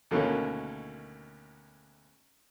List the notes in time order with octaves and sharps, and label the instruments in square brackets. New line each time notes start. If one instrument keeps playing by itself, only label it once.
[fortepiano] D2 B2 D3 D#3 A#3 C#4